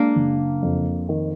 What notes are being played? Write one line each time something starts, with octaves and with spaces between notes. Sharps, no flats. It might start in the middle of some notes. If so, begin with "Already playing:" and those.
Already playing: G#3 A#3 D4
F#1
F2
D#3